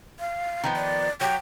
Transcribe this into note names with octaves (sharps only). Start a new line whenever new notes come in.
F5
D#3 F3 B3
D5
F#3 G5